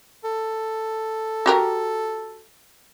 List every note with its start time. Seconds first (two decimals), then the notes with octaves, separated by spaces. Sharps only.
0.24 A4
1.46 F#4 G4 A#4